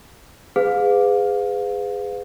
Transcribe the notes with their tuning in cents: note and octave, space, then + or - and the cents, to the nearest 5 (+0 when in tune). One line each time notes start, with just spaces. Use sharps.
G#4 -10 B4 +35 F5 +30